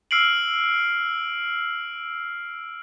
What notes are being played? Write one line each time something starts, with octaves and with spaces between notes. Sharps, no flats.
E6 F6 C7 D7 F#7